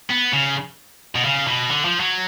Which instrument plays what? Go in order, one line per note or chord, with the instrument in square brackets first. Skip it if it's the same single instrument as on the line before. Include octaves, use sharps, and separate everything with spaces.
[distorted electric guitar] B3
C#3
B2
C#3
B2
D3
F3
F#3